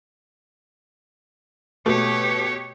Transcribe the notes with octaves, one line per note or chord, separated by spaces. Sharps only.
B2 A3 G4 C#5